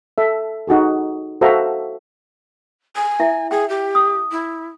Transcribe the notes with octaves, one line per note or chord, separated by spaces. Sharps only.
A4 E5
D#4 F#4 G#4 A4
F#4 A4 C5 E5 F5 A#5
G#5
E4 E5
G#4 G5
G4
D#6
E4